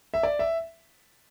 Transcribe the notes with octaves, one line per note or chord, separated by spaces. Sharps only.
E5
D5
E5